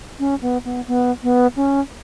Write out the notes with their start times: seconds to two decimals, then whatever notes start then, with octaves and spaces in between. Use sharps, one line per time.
0.19 C#4
0.42 B3
0.65 B3
0.88 B3
1.23 B3
1.56 C#4